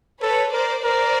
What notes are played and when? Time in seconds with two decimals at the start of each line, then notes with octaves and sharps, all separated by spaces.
0.22 A4 B4 C#5
0.53 A#4 C5 D5
0.83 A#4 C5 D5